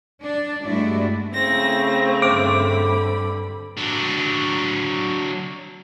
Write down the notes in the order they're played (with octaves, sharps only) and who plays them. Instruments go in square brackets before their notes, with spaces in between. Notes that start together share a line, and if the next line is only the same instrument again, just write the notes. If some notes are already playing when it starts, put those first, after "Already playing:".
[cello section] D4
G2 G#3 A3 D4 E4 F#4
[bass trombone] C#3 [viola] A3 C4 [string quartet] E4 A#6
[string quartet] G2 D3 B5 [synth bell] D6 D7
[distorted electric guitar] F#3 D4